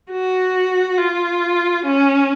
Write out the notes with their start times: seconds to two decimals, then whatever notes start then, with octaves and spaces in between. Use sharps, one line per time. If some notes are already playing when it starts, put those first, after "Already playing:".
0.11 F#4
0.98 F4
1.85 C#4